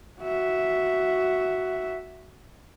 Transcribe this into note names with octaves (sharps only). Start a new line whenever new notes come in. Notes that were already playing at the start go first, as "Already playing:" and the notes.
F#4 E5